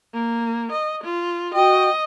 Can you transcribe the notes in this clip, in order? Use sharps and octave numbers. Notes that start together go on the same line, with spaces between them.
A#3
D#5
F4
F#4 D#5 G5